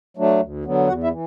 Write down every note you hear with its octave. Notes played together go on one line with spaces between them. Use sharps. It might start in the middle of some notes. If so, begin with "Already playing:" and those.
F#3 A3 D4
D2
D3 F#3 B3
E2 F#4 F#5
E4 E5
E3